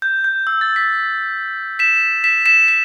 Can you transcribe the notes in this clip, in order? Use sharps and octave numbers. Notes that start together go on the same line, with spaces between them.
G6
G6
E6
A6
B6
B6 E7
B6 E7
B6 E7
B6